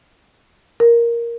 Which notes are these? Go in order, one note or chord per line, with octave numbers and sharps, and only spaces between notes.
A#4